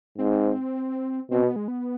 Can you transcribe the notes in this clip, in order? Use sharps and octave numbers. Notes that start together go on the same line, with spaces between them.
G#2 C4
B2 C4
B3
G#3
B3